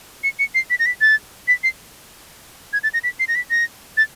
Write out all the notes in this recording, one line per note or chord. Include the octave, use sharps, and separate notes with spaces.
C#7
C#7
C7
B6
A#6
B6
A6
B6
C7
G#6
A6
A#6
B6
C7
A#6
B6
A#6
A6